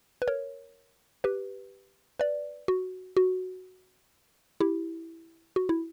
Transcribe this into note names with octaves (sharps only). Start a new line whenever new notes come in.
B4
A#4 C#5
G4 B4
B4 D5
F#4
F#4
E4 G4
F#4
E4